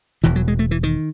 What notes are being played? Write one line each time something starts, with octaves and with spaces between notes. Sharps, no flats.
E1 E2 B2 E3
F#3
G#3
A3
E3
D#3